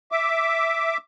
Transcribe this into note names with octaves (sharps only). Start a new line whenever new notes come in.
E5 D6